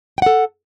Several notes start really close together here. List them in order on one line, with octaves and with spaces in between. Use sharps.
G5 F#5 A4